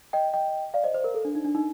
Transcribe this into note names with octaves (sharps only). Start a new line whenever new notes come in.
D#5 G5
D#5 G5
D5 F5
C5 D#5
C5
A#4
A4
D4
D#4
D4
D#4